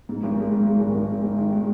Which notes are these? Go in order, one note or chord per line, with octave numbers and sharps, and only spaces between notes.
G#2
G#1
G#3
G#2
G#3
G#1
G#1
G#3
G#2
D#3
G#3